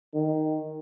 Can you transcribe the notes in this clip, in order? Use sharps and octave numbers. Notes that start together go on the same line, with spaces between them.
D#3